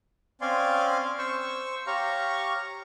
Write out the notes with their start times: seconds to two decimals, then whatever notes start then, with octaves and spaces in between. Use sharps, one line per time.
0.41 C4 C#4 D5 F5 G#5 C6
1.18 C5 C#6 E6
1.87 G4 C#5 F5 A#5 C#6